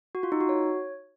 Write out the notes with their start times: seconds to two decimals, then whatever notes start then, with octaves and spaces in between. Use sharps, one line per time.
0.15 F#4
0.23 F4
0.32 D#4
0.40 F#4
0.49 C#5